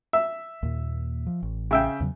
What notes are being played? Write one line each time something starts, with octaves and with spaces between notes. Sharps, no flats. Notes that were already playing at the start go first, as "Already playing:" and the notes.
E5
D#2 A#2
F3
A1
C#3 E5 G5
E2 C#3 F#3